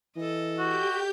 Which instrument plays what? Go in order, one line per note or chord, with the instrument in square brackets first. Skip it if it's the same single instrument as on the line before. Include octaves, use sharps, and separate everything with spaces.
[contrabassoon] E3 [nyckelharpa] A4 D#5
[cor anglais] F#4 [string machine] G4 G6